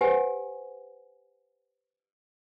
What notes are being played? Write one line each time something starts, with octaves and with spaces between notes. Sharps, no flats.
G4 B4 C5 F#5 G#5